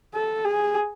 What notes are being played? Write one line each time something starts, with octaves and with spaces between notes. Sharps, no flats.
A4
G#4